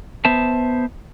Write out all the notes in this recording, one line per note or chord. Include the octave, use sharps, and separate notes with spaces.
B3 C5 E5 A5